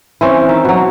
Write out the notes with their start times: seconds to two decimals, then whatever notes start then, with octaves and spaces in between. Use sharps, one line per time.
0.21 E3 C4 C#4
0.49 D#3 E5
0.65 B2 F#3